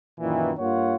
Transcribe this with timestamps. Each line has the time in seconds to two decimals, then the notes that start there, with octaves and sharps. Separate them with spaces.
0.19 F#2 A#2 D#3 E3
0.58 G2 A#3 F4 C#5 F#5